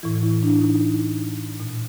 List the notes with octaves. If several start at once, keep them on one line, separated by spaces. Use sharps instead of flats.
A2 E3 E4
E4
D4
D#4
A#2